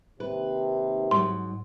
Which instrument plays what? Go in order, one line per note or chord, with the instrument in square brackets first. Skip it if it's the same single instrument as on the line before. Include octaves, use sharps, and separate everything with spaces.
[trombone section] D#2 C3 [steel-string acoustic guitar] B4
[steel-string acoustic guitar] G#2 F#3 [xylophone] C6